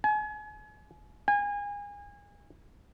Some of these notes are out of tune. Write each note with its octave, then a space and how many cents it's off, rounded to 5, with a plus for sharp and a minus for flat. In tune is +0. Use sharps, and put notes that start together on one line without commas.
G#5 +35
G#5 -30